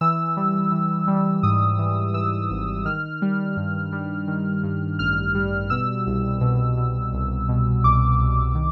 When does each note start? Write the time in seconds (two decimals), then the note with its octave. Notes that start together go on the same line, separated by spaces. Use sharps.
0.01 E3 E6
0.37 G3
0.72 E3
1.08 G3
1.43 G#2 D#6
1.79 E3
2.14 E3 E6
2.50 G#1
2.85 D#3 F6
3.22 G3
3.57 G2
3.92 G3
4.28 D#3
4.63 G2
4.99 A1 F6
5.35 G3
5.70 B2 E6
6.06 C2
6.41 B2
6.77 B2
7.13 C2
7.49 B2
7.84 C2 D6
8.19 C2
8.55 D#3